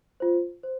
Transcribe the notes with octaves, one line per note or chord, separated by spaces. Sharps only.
F4 C5
C5